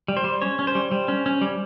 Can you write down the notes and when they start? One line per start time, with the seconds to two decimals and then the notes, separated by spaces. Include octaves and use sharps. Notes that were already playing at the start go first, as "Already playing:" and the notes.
0.08 G3
0.17 C5
0.24 G3
0.42 C#4 C#5
0.59 C#4
0.67 C5
0.75 G3
0.92 G3
1.08 C#4
1.26 C#4
1.41 G3